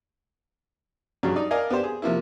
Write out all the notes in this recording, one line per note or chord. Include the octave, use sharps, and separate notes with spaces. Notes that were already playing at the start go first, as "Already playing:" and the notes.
G2 C#3 F#3
D#4 D5
A#4 D5 D#5 F5 G#5
B3 D4 G4 C5
G#4
C3 F3 A#3 E4